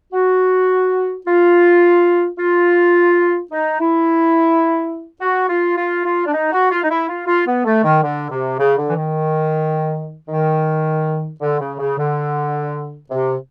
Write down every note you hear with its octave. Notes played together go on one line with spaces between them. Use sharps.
F#4
F4
F4
D#4
E4
F#4
F4
F4
F4
D4
D#4
F#4
F4
D#4
E4
F4
F4
B3
A3
D#3
D3
C3
C#3
D3
E3
D#3
D#3
D3
C#3
C#3
D3
C3